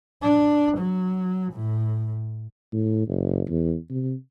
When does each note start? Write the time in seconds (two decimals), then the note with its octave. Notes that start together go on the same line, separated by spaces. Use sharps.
0.23 D4
0.78 F#3
1.53 A2
2.73 A2
3.08 F#1
3.49 E2
3.90 C3